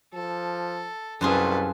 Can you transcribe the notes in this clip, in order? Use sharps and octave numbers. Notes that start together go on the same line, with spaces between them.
F3 A4
C2 F#2 F4 G#4 A4 B4